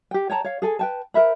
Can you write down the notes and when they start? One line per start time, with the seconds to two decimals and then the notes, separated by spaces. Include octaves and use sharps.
0.11 G4 G5
0.30 C#5 G5 A5 A#5
0.44 C#5 F5
0.62 G#4 A4 G#5
0.79 B4 G5 A5
1.14 A#4 C5 E5 B5